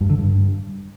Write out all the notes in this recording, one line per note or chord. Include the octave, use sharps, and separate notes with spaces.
G2
D3
G2